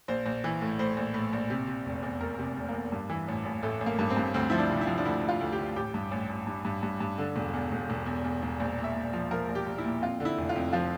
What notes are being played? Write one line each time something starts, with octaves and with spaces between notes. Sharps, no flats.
A#1 C5
A#1
E3
A2
A2 C5
A#1
A2
A#1
C3
C3
F1
E2
F1 A#4
C3
F1
A#3
E2
G2
E3
A1
A1
A1 A3
A1
A#3
G2
C4
G2
D2 C4
F3 E4
D4
C3
E4
F3
D4
D2 E4
D2
F4
D2
G4
D2
A1 G4
G2
A1
A1
G2
G2
G2
G2
D3
E1
E2
E1
E1
E2
E2
E1
A#1
A#2
E5
A#2
F3
F3 A#4
A#1
G4
A#1
E4
A#2
F2 F4
D3
E4
F1
F4
F2
F3 F4